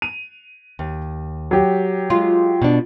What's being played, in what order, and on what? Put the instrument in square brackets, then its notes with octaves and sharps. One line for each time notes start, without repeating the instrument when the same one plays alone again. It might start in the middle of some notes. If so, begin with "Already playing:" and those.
[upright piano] D#7 F7
[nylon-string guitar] D#2
[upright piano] F#3 G4
[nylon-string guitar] G#3 [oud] F4
[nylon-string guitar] B2 D4